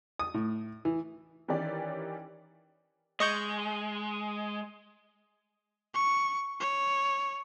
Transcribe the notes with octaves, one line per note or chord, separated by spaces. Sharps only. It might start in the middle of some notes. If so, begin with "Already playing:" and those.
D#6
A2
E3
D#3 E3 C#4 G4 A#4 D5
G#3 D#5 C#6 G6
C#6
C#5